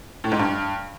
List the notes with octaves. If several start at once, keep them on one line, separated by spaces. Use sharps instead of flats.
A2
G#2
G2